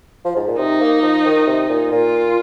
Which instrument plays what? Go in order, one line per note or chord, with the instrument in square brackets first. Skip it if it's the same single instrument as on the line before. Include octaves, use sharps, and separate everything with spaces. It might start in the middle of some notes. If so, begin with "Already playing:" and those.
[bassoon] F3
G#2
A#2
[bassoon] C3 [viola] D#4
[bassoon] A#3
F3
D#3
C3
A#2
[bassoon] A#2 [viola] F4